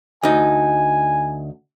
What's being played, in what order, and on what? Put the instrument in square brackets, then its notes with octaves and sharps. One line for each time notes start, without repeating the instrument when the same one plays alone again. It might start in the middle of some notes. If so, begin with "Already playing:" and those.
[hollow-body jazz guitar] D2 D#4 [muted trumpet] G#5